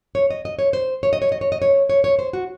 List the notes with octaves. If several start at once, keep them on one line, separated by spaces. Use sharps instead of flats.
C#5
D#5
D#5
C#5
C5
C#5
D#5
C#5
D#5
C#5
D#5
C#5
C#5
C#5
C5
F#4